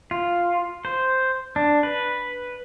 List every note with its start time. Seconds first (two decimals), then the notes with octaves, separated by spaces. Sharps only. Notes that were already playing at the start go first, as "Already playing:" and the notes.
0.11 F4
0.85 C5
1.56 D4
1.83 B4